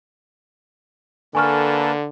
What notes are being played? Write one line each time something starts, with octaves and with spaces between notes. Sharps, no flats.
D3 A#3 A4 B4 G#5 C#6 F6